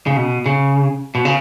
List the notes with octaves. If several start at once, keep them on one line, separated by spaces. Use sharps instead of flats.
C#3
B2
C#3
B2
C#3